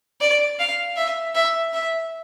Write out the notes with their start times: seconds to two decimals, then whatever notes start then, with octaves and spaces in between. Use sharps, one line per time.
0.21 D5
0.59 F5
0.97 E5
1.35 E5
1.73 E5